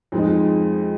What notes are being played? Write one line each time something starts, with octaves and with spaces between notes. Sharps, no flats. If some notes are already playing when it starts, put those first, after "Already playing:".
F2 F3 G#3 D#4